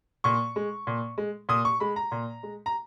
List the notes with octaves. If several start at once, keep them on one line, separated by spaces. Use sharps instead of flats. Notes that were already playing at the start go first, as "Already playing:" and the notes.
A#2 C#6
G#3
A#2
G#3
A#2 D#6
C#6
G#3 B5
A#5
A#2
G#3
A#5